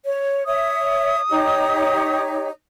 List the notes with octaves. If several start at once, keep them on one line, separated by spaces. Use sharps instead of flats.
C#5
C#5 E5 D#6
D#4 G4 C#5